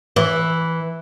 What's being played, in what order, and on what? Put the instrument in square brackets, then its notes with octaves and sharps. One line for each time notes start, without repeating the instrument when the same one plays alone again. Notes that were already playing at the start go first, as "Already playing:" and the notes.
[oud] E3